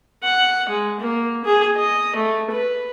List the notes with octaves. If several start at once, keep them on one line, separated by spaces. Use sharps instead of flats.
F#5
G#3
A#3
G#4
D#5
A3
B4